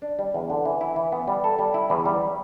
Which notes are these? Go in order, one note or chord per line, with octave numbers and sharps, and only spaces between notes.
D4
G3
E2
D3
E3
E4
E3
B3
G3
A4
G3
E4
E2
G3